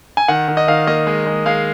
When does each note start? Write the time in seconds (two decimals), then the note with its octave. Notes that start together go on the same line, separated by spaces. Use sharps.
0.17 G#5
0.28 D#3 F#5
0.48 D#3
0.57 D#5
0.68 D#3 F5
0.87 A#3 D#5
1.07 G#3
1.27 G#3
1.46 G#3 F5